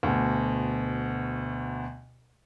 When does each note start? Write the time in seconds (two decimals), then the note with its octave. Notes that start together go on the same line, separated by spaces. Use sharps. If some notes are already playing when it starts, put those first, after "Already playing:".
0.03 D2 B2